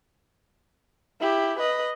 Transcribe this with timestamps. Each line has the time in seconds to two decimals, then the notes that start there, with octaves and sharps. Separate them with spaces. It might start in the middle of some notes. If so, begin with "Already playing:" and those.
1.21 E4 G4
1.59 B4 D#5